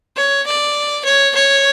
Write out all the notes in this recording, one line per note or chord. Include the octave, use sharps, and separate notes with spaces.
C#5
D5
C#5
C#5